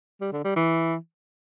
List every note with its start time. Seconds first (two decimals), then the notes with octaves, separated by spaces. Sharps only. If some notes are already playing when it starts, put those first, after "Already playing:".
0.21 G3
0.32 D3
0.44 G3
0.56 E3